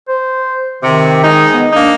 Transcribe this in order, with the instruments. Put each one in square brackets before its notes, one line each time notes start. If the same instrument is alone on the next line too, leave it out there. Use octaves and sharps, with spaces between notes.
[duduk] C5
[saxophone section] C3 [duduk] D#3
[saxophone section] G#3 D#4
[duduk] B3
[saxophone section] A#3 D#4 [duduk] D4